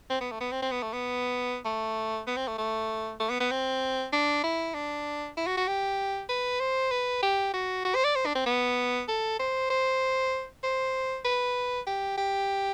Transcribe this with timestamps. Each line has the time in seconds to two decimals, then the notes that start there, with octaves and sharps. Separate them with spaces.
0.10 C4
0.21 B3
0.31 A3
0.41 B3
0.52 C4
0.62 C4
0.72 B3
0.82 A3
0.93 B3
1.65 A3
2.27 B3
2.37 C4
2.48 A3
2.58 A3
3.20 A3
3.30 B3
3.40 B3
3.51 C4
4.13 D4
4.44 E4
4.74 D4
5.37 E4
5.47 F#4
5.57 F#4
5.68 G4
6.29 B4
6.60 C5
6.91 B4
7.23 G4
7.54 F#4
7.85 F#4
7.95 C5
8.04 D5
8.15 C5
8.26 D4
8.35 C4
8.46 B3
9.08 A4
9.39 C5
9.70 C5
10.63 C5
11.25 B4
11.87 G4
12.17 G4